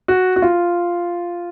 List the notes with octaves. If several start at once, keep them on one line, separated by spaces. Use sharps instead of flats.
F#4
F#4
F4